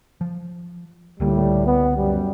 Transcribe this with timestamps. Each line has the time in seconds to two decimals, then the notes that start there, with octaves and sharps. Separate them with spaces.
0.21 F3
1.20 C#2 A2 D3 G3 A#3
1.66 B3
1.97 F#2 G3